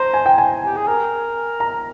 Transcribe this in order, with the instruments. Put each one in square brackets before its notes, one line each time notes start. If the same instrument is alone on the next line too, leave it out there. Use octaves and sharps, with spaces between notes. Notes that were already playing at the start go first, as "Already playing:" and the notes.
Already playing: [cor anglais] C5 [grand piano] A#5
[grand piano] G#5
G5
G#5
[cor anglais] G4
G#4
A#4
[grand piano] A#5